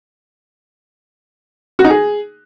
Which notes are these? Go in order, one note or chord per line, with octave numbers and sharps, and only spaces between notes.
F#4
D#4
G#4